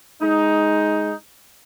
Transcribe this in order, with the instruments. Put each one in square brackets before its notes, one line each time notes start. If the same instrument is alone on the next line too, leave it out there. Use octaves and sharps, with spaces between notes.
[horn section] G#3 D#4